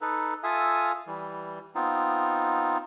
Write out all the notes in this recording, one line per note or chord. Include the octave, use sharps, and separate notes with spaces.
D#4 A4 B4
F4 A4 E5 F5 G#5 D#6
E3 G3
B3 C4 D#4 F4